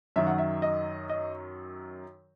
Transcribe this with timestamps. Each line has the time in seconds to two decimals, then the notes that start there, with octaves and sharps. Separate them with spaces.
0.16 F#2 D#3 F#3 E5
0.27 F#5
0.38 E5
0.62 D#5
1.10 D#5